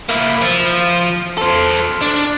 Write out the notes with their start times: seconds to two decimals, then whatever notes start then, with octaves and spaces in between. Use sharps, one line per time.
0.09 A#3 E4
0.41 F3
1.38 A4 C5
2.01 D4